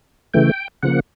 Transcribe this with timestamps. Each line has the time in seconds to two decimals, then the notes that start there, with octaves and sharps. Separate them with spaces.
0.34 C#3 E3 A3 G5
0.83 C#3 F3 A#3 F#5